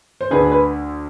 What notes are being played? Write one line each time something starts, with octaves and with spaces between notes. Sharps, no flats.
C5
D2 D3 G#4 B4
B4